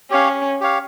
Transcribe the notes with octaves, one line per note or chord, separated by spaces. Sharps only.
C#4 G4 C#5 F5
G4 C#5 F5